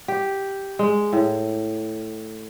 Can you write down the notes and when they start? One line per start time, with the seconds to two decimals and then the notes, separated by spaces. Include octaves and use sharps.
0.08 G4
0.79 G#3
1.13 A2